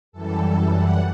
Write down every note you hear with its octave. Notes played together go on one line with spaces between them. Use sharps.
F#2 E3 G3 A4
F#5